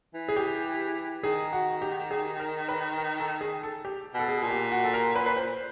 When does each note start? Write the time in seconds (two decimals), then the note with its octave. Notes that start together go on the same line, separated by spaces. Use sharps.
0.14 E3
0.29 G#4
0.36 G4
1.23 D#3 G#4
1.53 F#4
1.82 G4
2.11 G#4
2.40 A#4
2.69 B4
2.98 A#4
3.20 A4
3.41 G#4
3.63 A4
3.85 G4
4.14 B2
4.19 A4
4.28 G#4
4.42 A#2
4.51 G4
4.71 F#4
4.84 A4
4.94 A#4
5.16 B4
5.26 B4
5.37 C5